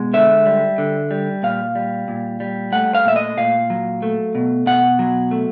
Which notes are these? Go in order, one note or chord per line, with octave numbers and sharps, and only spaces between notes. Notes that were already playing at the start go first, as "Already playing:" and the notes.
Already playing: B2 G#3
D3 E5
G3
D3
G3
A#2 F5
G3
A#2
G3
A3 F#5
F5
A#2 E5
D#5
A#2 F5
F#3
A3
B2
B2 F#5
F#3
A3